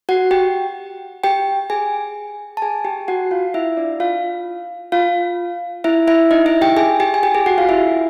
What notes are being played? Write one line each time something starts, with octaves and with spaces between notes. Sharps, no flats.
F#4 F#5
G4 G5
G4 G5
G#4 G#5
A5
G#4 G#5
G4 G5
F#4 F#5
F4 F5
E4 E5
D4 D5
F4 F5
F4 F5
E4 E5
E4 E5
D#4 D#5
E4 E5
G4 G5
G#4 G#5
G4 G5
G#5
G4 G5
G#4 G#5
F#4 F#5
F4 F5
E4 E5